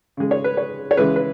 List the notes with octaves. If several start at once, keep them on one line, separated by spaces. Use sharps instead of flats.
C#3 G#3
C#5
B4
C#5
C#5
C#3 E3 G#3 B4
B4